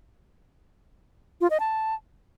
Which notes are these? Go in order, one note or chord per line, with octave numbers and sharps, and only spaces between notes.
F4
D#5
A5